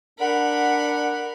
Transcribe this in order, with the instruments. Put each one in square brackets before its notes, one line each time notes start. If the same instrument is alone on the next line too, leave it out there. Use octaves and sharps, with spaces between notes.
[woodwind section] D4 F#5 [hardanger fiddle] A#4 B5